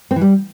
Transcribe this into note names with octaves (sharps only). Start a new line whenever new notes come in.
C4
E3
G3